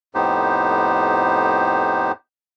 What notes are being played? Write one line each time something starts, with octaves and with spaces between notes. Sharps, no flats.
F2 A2 B3 D#4 G4 C5